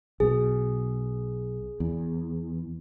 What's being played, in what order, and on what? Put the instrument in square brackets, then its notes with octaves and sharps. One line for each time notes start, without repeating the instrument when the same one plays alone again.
[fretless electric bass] B1 B2 [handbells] G#4
[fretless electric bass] E2